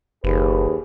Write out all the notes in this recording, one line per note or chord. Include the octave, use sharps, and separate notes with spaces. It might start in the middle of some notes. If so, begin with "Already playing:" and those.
F#1 D#2 G#4 B4